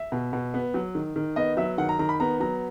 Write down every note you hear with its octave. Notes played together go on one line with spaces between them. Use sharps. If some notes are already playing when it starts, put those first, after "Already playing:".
Already playing: E5
B2
B2
B3
F#3
D#3
D#3
B3 D#5
F#3 E5
D#3 F#5
A#5
D#3 A#5
B5
B3 A#5
F#3 A#5